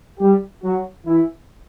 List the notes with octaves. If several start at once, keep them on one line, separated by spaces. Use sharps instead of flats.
G3 G4
F#3 F#4
E3 E4